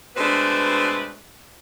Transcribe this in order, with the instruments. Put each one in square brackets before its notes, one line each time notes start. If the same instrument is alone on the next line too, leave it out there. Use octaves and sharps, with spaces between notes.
[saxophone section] B2 G#3 A3 C4 D4 B4